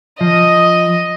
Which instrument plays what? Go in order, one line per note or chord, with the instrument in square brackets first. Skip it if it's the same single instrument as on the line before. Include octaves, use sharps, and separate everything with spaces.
[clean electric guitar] F3 [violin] D#5